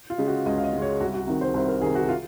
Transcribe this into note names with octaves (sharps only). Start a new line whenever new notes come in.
F4
C#3 G#3
F#4
C#2 D#5
F5
D#5
C#3 G#3
C#5
C2 F#4
F#4
C3 D#3
C5
C2 C5
A#4
C3 D#3 G#4
F#4
F4